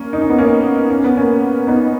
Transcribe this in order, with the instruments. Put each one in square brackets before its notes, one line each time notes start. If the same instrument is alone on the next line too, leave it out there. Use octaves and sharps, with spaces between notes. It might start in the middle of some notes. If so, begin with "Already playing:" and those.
Already playing: [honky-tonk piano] A#3 C#4
D#4
C#4
B3
A#3 C#4
C#4
B3
A#3 C#4
B3 D#4